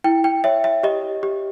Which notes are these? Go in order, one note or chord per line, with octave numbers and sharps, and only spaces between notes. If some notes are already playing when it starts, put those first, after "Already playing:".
E4 G5
G5
C#5 E5
E5
G4 D#5
G4